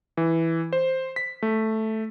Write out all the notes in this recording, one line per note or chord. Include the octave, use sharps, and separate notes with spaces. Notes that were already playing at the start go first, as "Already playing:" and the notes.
E3
C5
B6
A3